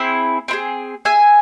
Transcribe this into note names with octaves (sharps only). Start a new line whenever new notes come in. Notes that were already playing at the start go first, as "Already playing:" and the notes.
Already playing: C4 E4 G#4
C4 E4 G#4
G#4 E5 G#5